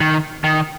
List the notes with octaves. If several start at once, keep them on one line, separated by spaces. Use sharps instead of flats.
D#3
D#3